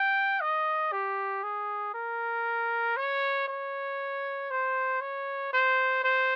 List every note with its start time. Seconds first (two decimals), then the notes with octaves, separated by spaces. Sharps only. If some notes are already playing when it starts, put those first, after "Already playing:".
Already playing: G5
0.41 D#5
0.92 G4
1.43 G#4
1.94 A#4
2.97 C#5
3.48 C#5
4.51 C5
5.01 C#5
5.53 C5
6.04 C5